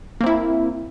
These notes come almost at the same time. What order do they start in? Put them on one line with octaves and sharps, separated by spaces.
A#3 C4 E4